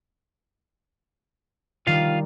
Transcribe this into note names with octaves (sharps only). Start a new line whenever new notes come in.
D#3 G3 F4 F5